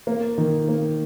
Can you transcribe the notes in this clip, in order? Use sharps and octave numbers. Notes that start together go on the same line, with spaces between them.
A#3
D#3
A#3